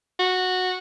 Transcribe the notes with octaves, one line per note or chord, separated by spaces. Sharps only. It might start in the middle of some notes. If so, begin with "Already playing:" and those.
F#4